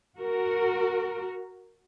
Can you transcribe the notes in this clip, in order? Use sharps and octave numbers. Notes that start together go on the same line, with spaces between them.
F#4 A#4